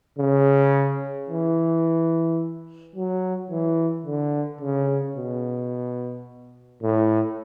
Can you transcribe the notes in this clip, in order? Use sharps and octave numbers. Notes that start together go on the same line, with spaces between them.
C#3
E3
F#3
E3
D3
C#3
B2
A2